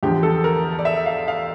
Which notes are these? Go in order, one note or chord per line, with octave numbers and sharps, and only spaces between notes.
E2 D3 F3 G4
A4
A#4
D5
E5
F5
F5